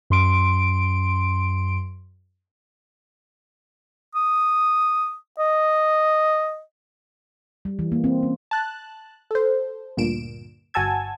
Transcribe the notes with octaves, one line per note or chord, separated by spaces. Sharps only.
F#2 C6 D7
D#6
D#5
G3
E3
A#3
C4
C#4
A5 F#6
A4 C5
D2 G2 A#2 D7 E7
G1 F#4 G#5 A5 E6 G#6